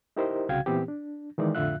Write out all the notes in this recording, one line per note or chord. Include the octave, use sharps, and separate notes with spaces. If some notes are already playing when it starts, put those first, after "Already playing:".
D#4 E4 G4 A#4 C5 D#5
C2 C#3 F#4 F5 G5 G#6
A#2 E3 B3 C4 G4
D4
D#3 E3 G#3 D#4 D5
F2 A2 D3 F4 E5 F#6